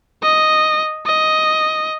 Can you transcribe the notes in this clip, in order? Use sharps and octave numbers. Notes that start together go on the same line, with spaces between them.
D#5
D#5